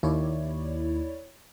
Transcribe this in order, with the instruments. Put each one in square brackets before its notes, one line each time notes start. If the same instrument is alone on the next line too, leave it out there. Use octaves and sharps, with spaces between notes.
[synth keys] D#2 [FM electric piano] E4 C#5 D5